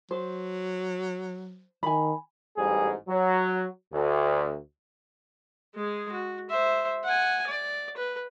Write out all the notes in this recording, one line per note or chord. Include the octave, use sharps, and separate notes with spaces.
F#3 C5
D#3 G#5 B5
A1 G#2 G3 G#4
F#3
D2
G#3 G#4
F#4
C5 E5
F#5 G#5
D5
B4